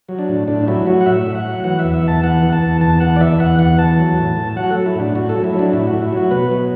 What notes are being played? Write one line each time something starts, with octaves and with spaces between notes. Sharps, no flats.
F#3
D4
A2
A2 D4
F#3 E4
F#3 F#4
F#5
A2 E5
A2
F#5
F#3
E3 F#5
E2 E5
E5
E2 A5
E3 F#5
E3
A5
E2
E2 A5
E3 F#5
D5
E3 E5
E2 F#5
E2 F#5
E3 A5
F#3
A2
A2
F#3 F#5
F#4
F#3 A4
E4
A2 D4
A2 F#4
A4
F#3
E4
F#3
D4
A2 E4
F#4
A2
E4
F#3 F#4
B2 B4
F#3